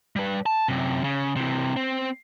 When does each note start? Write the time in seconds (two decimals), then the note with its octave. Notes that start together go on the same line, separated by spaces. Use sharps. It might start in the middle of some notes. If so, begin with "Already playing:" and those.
0.16 G3 B4
0.46 A5
0.68 F#2 C3
1.04 C#3
1.36 C3 E3
1.77 C4